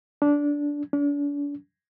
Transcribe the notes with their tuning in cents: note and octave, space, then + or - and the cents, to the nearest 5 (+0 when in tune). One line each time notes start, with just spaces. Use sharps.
D4 -15
D4 -40